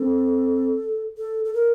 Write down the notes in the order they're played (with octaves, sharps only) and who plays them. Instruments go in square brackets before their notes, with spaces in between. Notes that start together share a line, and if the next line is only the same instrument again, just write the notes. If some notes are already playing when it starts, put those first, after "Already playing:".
Already playing: [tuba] C4 [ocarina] A4
[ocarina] A4
A4
A#4